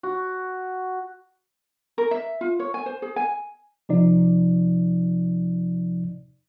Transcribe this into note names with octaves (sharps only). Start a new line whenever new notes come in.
F#4
A#4
E5
F4
C#5
G#5
C5
G#4
G#5
C3 F3 D#4 D5